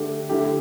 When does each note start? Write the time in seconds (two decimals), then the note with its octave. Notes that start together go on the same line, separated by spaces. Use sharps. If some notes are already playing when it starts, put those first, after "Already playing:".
Already playing: D3 A3 D4 G4
0.29 D3 A3 E4 G4